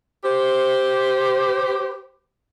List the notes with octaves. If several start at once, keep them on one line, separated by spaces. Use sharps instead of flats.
G4 C5